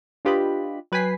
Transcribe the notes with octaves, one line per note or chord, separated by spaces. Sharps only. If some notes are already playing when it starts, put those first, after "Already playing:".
D4 F4 G4 B4 D#5 B5
F#3 B4 G5 G#5 B6 C7